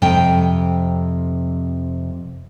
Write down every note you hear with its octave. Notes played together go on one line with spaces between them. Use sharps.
F2 C3 G5